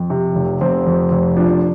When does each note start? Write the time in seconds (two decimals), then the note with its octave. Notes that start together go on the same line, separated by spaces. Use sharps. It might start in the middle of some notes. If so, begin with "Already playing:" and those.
Already playing: F2
0.10 C3
0.35 F1
0.61 F1 C4
0.87 F2
1.11 F1
1.37 F3 D4